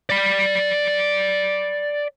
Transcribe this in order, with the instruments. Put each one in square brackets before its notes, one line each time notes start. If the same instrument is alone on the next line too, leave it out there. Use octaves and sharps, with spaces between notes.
[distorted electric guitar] D5 B5